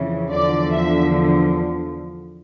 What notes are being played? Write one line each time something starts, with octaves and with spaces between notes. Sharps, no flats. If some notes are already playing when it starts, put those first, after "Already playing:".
Already playing: F2 C#3 E3
E2 D3 F3 D5
E5